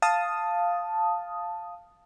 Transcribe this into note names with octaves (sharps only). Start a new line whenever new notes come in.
F5 A5 D#6